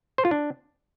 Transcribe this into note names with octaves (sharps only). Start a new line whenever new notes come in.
C5
F4
D4